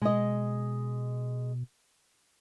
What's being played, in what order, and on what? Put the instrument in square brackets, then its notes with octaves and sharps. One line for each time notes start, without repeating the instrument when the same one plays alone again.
[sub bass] B2 [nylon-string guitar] G#3 D#5